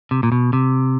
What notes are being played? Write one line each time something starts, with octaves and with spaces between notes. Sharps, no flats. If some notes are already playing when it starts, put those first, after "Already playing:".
C3
A#2
B2
C3